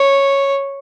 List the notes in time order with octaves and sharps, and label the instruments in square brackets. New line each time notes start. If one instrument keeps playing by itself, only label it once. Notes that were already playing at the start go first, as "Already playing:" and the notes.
Already playing: [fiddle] C#5